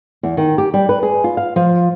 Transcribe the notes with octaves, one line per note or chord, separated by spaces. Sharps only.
E2
D#3
G4
G3
B4
G#4
F4
F5
F3